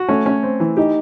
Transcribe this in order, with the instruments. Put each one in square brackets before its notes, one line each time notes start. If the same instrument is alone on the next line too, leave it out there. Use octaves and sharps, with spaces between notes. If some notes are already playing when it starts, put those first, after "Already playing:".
Already playing: [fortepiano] F#4
[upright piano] A3 [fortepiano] C#4
[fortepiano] C#4
C4
E3
[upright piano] D#4 [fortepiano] G4